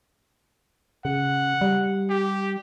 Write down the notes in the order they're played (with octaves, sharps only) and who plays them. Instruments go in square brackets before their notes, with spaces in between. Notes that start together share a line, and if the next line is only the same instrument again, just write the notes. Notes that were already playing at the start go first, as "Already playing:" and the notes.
[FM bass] C#3 [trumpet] F#5
[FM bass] G3
[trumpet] G4